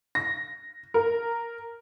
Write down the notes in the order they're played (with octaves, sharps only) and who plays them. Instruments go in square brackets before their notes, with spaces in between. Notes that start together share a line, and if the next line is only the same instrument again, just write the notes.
[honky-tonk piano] A#6
A#4